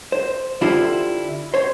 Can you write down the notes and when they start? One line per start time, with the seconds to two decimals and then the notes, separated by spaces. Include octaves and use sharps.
0.12 C5
0.61 D3 E4 F4 G4 C5
1.54 C5 C#5